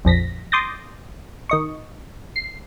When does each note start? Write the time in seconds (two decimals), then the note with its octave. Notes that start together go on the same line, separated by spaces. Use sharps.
0.05 A#1 F2 A#6 B6
0.52 C6 D6 D#6 G6 A6 A#6
1.49 D#3 D#5 C#6
2.36 C7